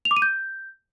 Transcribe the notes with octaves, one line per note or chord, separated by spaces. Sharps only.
F7
D6
D#7
G6